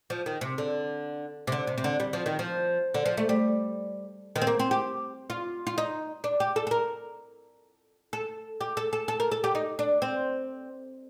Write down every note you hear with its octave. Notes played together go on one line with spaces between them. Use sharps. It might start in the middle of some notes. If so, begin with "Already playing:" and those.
F3
D#3
C3
D3
C3
D3
C3
C3
D3
G3
F3
D#3
F3
D3
F3
A3
G3
D#3
C4
A#3
C4
G4
F4
F4
D#4
D4
G4
A4
A4
A#4
A4
G4
A4
A4
A4
A#4
A4
G4
D#4
D4
C4